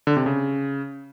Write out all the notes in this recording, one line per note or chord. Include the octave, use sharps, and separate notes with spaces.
D3
C3
C#3